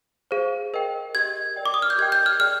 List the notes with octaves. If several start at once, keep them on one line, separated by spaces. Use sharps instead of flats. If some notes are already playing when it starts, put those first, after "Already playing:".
G#4 C5 F5
A#4 D#5 G5
G4 A#4 D#5 G#6
A#4 D5 G5
D6
D#6
F6
G6
G4 A#4 D#5 G5 G#6
G6
F6
G#4 D5 G5 F6